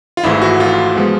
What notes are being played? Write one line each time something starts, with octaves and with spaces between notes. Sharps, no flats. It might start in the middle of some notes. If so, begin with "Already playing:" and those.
F4
G#1 G#2 E3 A3 E4
F#4
F4
F3 G#3 B3